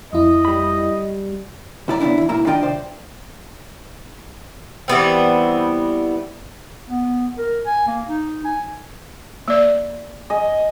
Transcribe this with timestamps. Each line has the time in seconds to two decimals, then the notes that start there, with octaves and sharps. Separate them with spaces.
0.13 F2 E4 D#5
0.45 G3 B5
1.88 C#2 E4 D5 A#5
2.00 C#3 B3 C4 D4 E4
2.18 E3 E4
2.29 B1 G#2 A#3 E4 A#5
2.47 D#3 D4 F4 D#5 G5
2.63 C3 C5 D5
4.88 E3 G3 B3 C4
6.90 B3
7.38 A#4
7.66 G#5
7.87 A#3
8.08 D#4
8.45 G#5
9.48 A#3 D5
10.30 D#5 G#5